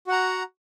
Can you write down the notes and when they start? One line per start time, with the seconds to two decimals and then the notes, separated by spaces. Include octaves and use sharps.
0.07 F#4
0.09 F#5
0.12 A#5